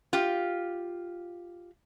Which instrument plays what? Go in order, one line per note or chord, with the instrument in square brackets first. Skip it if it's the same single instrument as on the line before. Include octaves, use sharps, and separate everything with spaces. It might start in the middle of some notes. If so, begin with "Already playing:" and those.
[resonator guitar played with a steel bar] F4 G4